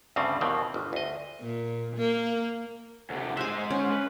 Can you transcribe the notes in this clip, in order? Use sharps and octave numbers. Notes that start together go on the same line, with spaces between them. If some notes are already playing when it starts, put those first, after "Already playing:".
D2 G2 C#3 G3 C4
D#2 B2 D#3 E3 C4
G1
D2 D#5
A#2
A#3
D2 C3
G#3 C5 E5 G#5
C#4
B4